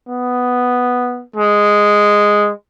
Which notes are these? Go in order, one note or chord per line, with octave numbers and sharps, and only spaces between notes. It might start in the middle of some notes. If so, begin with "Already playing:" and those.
B3
G#3